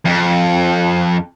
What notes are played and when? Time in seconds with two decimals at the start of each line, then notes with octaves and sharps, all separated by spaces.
0.05 F2